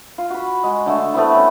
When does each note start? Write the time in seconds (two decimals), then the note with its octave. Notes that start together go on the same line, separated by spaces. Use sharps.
0.18 F4
0.30 F#4 B5
0.63 G#3 F#4
0.86 D3 A3 A5
1.14 A3 B3 C4 E4
1.32 C4 C#4